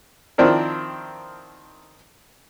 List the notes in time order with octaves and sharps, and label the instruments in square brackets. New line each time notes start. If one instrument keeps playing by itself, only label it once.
[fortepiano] D#3 F3 C4 D4 E4 A#4